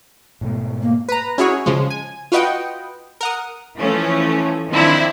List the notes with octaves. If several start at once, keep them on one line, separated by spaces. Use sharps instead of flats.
G#2 B2 A3
A#3
B4 A#5
C#4 E4 F#4 G#4 C#5
C#3 F3 G#3
G#5
F4 F#4 B4 D#5 F#5 G5
A#4 F#5 D#6
E3 F3 A3 C#4
D#3 F3 C4 D4 E4